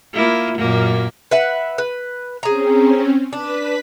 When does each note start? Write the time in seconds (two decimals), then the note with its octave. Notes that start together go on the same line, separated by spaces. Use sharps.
0.13 A#3 E4 F4
0.58 F#2 A#2 A#3
1.31 B4 E5 F#5
1.78 B4
2.43 C4 C#4 G#4 A#5
3.33 D4 B4 B6